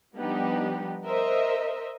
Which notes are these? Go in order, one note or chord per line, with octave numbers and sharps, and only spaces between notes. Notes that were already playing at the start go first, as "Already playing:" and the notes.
F3 G3 B3 D4 D#4 G4
A#4 C5 D#5 E5